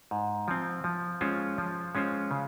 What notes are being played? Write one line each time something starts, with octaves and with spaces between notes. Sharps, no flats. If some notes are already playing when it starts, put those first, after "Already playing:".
G#2
F3 C4
F3
G#3 C#4 F4 C5
F3
G#3 C#4 F4 C5
C#3